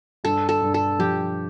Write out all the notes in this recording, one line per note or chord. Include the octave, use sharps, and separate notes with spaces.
G2 A4
A4
G2
A4
F3 G4